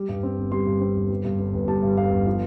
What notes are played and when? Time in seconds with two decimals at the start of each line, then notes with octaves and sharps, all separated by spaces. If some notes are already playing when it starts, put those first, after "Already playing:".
Already playing: G3
0.09 G2
0.23 C4
0.38 G1
0.52 G3 C6
0.67 G2
0.81 C4
0.96 G1
1.10 G3
1.25 G2
1.39 G1
1.54 G1
1.68 G3 A5
1.83 G2
1.97 G1 F5
2.12 G1
2.27 F3 F5